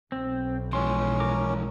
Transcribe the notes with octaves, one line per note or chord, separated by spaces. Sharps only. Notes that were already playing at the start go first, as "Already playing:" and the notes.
B1 C4
E3 F3 G#3 C#4 C6
A#4 D6